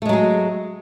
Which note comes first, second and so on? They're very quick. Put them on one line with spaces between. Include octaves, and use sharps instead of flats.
A3 G#3 F#3 G#4